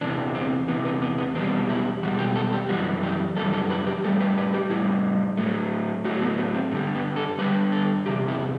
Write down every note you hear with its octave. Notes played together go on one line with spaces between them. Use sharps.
E2 C3 E3 D4
C4
E2 C3 E3 B3
B3
B3
B3
E2 B2 G3 C4
E4
E2 B2 G3 F#4
G4
A4
G4
F#2 E3 G3 F#4
G4
F#2 E3 G3 A4
A4
B4
G4
A2 G3 A4
B4
B4
G4
A2 G3 E4
A2 F#3 A3
A2 F#3 A3 F#4
B3
B3
C4
G2 D3 G3 A3
B3
A4
G2 D3 G3 B4
A4
E2 C3 G4
E4